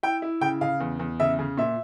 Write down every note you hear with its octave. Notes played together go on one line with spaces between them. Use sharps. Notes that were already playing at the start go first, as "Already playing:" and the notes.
E4 G5
E4
C#3 G5
C#3 F5
E2
E2
C#3 E5
C#3
A#2 E5